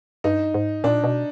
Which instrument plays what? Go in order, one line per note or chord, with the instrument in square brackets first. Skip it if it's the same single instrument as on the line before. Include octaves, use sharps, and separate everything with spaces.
[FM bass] G2 [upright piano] D#4
[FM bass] G#2
[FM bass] A#2 [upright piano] D4
[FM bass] B2